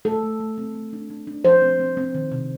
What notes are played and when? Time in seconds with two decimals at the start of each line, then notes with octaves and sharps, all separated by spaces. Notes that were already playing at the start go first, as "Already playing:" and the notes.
0.05 A3 A4
0.23 A3
0.40 A3
0.58 C4
0.75 A3
0.93 D4
1.10 D4
1.27 D4
1.44 F3 C5
1.62 C4
1.80 C4
1.97 C4
2.15 D#3
2.32 C3